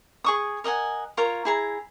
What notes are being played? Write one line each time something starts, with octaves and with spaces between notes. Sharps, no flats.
G#4 C#6 D#6
A#4 D#5 F#5 G#5
F4 A#4 C#5 A#5
E4 G#4 A#5